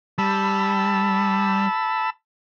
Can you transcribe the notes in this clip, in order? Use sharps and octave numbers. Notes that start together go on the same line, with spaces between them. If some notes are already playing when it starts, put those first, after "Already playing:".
G3 A5 B5 E6